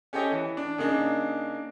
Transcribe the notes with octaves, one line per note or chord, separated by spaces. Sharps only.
C#4 G4 A4 C#5 D#5
E3
D4
C#3 A#3 D4 D#4